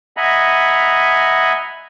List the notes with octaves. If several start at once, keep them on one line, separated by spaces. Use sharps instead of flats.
D#5 E5 F#5 G#5 A#5 B5